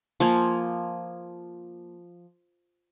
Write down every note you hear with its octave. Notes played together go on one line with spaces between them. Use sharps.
F3 A#3 G#5